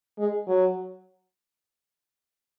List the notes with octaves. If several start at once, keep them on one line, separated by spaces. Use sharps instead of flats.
G#3
F#3